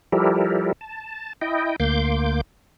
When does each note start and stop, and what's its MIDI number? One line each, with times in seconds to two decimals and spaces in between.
0.12 0.72 53
0.12 0.72 55
0.12 0.72 64
0.12 0.72 67
0.12 0.72 69
0.12 0.72 70
0.81 1.33 81
1.42 1.76 64
1.42 1.76 75
1.42 1.76 79
1.80 2.41 38
1.80 2.41 58
1.80 2.41 84
1.80 2.41 86
1.80 2.41 91